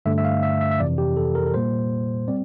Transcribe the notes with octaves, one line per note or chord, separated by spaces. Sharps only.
G2 D3 A3 E5
E5
F5
E5
E5
E5
F2 C3 E3 D5
G4
A4
A#4
A#4
A#2 G3 A#3 C5
G3 C4 D5